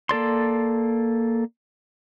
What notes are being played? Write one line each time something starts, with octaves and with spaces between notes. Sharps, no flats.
A#3 A4 D5 C6